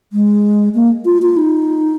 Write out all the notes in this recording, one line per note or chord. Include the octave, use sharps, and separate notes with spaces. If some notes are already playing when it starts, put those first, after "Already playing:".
G#3
A#3
F4
F4
D#4